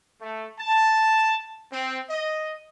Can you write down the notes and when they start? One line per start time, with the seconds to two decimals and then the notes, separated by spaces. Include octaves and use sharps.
0.22 A3
0.60 A5
1.73 C4
2.10 D#5